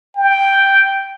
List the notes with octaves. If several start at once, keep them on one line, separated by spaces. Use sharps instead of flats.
G5